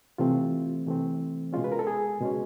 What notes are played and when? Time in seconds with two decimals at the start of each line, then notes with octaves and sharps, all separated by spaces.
0.18 C3 E3 A3 C4 F4
0.86 C3 E3 A3 C4
1.53 B2 G#3 C#4 F4
1.64 B4
1.72 A#4
1.79 A4
1.87 G#4
2.20 B2 G#3 C#4